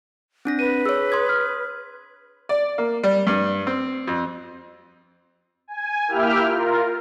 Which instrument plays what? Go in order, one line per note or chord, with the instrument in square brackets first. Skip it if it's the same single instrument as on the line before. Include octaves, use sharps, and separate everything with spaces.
[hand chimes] C4 D4 A#6
[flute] B4 [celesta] D#7
[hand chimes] G#4 C#5 [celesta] E6
[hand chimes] C6 D#6 G#6
[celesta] F6
[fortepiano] D5
A#3
G3
G2
C4
F2
[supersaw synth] G#5
A#3 E4 G4 E5 G5 F6
F4 A#4